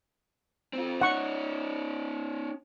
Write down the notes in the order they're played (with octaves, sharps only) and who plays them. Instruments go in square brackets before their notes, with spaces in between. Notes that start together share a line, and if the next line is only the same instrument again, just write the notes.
[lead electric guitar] C4 F4
[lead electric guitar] C#4 D#4 [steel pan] F#5 C#6